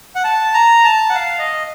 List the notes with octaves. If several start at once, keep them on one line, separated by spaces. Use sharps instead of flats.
F#5
A5
A#5
A5
F#5
F5
D#5